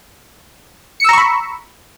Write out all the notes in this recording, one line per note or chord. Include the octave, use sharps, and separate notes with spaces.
A#5 B5 C#6 E6 C#7